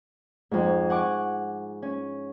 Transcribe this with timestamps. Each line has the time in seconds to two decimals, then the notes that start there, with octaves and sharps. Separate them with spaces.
0.51 F2 G#2
0.90 F#5 G#5 C#6 D6
1.82 C#4